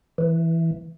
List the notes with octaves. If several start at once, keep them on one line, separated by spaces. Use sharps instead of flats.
E3